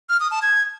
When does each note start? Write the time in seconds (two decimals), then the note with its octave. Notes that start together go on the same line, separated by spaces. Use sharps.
0.09 F6
0.20 D#6
0.31 A5
0.42 G#6